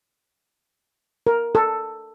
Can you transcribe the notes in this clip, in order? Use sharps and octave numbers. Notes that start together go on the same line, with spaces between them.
A#4
A4